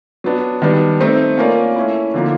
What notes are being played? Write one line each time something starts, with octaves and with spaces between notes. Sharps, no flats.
F#3 B3 D4
D#3 G3 B3 D4
A3 C4 D#4
A#3 C#4 F4 A#4 D5
A3 C#4 E4
D3 F3 A#3 D#4